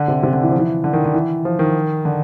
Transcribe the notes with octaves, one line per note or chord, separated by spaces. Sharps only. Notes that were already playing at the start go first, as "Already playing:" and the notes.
Already playing: D3
C3
C3
D3
E3
F3
E3
D3
D#3
D3
E3
F3
D#3
D3